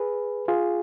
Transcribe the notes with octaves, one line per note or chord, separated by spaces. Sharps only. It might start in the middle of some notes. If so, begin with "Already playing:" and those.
Already playing: G#4 B4
F4 G#4